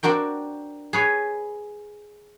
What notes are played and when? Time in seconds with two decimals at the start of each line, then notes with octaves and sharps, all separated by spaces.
0.03 C4 D4 F#4 A#4 G5
0.93 G#4 B4 C#5